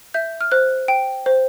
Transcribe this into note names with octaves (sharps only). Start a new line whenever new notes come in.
E5 G6
F6
C5 F#6
G5
C5